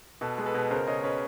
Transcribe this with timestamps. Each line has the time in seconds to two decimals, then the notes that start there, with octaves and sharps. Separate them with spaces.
0.21 B2 A4 B4
0.38 G#3
0.46 A4 B4
0.54 B2
0.71 C#3 A#4 C5
0.87 C#3 C#5 D#5
1.04 C#3 B4 C#5